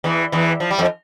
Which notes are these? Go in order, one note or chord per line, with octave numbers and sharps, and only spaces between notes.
E2 E3
E2 E3
F3
G3
F2 F3